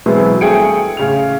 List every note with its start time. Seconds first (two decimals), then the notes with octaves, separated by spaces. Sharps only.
0.06 B2 E3 F#3 G#3 B3 C4
0.41 G2 A3 G#4 G5 C#7 D7
0.97 A1 C#3 F7